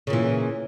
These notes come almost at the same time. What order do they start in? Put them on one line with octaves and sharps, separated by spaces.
C#3 A#2 E3